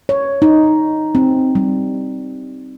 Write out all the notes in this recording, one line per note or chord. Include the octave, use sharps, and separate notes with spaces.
C#5
D#4
C4
G3